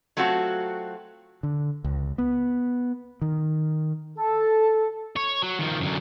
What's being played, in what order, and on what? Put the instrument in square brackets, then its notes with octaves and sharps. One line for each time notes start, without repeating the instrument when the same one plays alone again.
[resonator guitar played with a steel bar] F#3 A3 C4 F4 F#4
[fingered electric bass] D3
C#2
B3
D#3
[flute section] A4
[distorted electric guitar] C#5
F#3
D#3 F3
F#2 D3